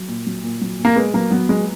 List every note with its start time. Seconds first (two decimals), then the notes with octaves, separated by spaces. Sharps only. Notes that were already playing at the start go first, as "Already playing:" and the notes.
Already playing: F#3
0.08 A#2
0.27 F#3
0.43 A#2
0.61 F#3
0.79 A#2
0.85 A#3
0.96 G#3 B3
1.14 F#3 A#3
1.30 F#3 B3
1.49 F#3 G#3